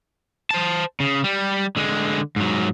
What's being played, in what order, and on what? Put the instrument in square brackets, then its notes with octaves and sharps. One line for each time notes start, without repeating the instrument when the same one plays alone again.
[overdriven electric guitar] C5 A5
C#3
G3
D3 G#3
G#2 F#3